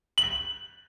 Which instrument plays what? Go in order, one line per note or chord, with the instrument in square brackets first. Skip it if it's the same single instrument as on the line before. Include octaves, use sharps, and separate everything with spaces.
[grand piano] F#7